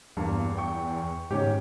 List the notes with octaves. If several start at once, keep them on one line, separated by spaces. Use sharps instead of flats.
E2 G2 A#3
G5 C#6
G#2 D#3 C#4 G4